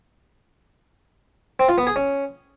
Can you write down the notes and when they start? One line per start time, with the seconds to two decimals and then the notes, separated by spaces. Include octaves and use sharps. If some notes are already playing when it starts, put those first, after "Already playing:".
1.60 C4
1.69 F4
1.78 B3
1.87 G#4
1.96 C#4